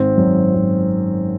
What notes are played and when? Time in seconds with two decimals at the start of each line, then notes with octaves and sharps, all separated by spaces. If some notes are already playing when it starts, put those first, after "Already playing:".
Already playing: G#1 C4
0.18 F#2
0.55 G#1